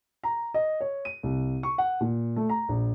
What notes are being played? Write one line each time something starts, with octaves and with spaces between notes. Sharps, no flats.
A#5
D#5
C#5
D#7
C2
C#6
F#5
A#2
A3
A#5
A#1